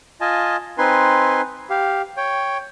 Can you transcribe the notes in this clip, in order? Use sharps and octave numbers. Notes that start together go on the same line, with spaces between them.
F4 D#5 G#5 A5
C4 D#4 B4 G#5 C6
G4 F5
C#5 G5